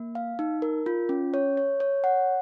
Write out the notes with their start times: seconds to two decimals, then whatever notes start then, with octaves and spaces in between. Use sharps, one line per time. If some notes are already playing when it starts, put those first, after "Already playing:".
Already playing: A#3
0.15 F5
0.39 D#4
0.62 A#4
0.86 F4
1.09 C#4
1.34 C#5
1.57 C#5
1.80 C#5
2.04 F#5